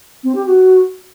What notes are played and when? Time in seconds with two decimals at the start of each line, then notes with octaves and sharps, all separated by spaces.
0.23 C4
0.34 G4
0.46 F#4